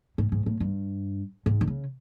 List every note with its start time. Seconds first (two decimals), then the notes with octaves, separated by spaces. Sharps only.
0.18 G#2
0.32 G#2
0.46 A2
0.60 G2
1.46 G#2
1.61 D3
1.67 C#3